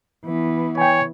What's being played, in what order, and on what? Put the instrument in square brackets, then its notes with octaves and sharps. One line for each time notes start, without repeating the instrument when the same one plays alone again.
[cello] E3 B3
[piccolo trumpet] C#5 [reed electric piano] G5 G#5